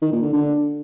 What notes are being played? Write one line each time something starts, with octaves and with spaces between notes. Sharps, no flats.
D#3
A#2
D3
D3